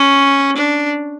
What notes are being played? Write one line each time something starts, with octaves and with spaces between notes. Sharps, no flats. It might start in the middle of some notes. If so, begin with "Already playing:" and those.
Already playing: C#4
D4